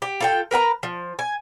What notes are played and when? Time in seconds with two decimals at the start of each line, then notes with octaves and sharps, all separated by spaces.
0.02 G4
0.20 F4 A4 G5
0.51 A#4 B4 F#5 A#5
0.83 F3
1.19 G#5